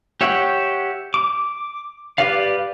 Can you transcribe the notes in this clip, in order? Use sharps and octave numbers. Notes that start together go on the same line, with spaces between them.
G4 C#5 E5 F#5 G5
D6
G4 B4 D5 F5